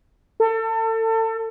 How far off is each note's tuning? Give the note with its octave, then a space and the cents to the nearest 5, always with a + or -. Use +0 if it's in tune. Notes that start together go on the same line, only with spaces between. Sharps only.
A4 +30